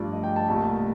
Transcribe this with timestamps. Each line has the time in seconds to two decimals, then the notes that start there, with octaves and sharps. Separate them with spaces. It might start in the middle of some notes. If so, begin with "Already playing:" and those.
Already playing: G2 F3 A3 D5
0.12 D#5
0.24 G5
0.36 A5
0.48 C2 A#2 A3